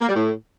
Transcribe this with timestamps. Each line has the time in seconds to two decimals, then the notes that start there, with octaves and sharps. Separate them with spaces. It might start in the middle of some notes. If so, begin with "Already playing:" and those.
0.01 A#3
0.09 G3
0.16 A2